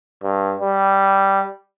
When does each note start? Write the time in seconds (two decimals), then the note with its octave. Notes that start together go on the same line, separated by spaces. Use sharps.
0.23 G2
0.60 G3